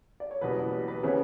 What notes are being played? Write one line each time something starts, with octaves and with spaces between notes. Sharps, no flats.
D5
C#5
F#1 E2 B2 G3 B4
G4
B4
C#3 E3 B3 C#5